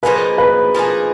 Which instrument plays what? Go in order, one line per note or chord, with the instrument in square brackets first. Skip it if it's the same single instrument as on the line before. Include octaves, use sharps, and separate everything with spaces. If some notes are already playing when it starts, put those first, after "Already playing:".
[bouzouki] F3 A#3 D#4 G#4 [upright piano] B4
[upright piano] B4
[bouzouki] F3 A#3 D#4 G#4